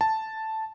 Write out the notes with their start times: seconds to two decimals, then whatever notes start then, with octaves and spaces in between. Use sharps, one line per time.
0.01 A5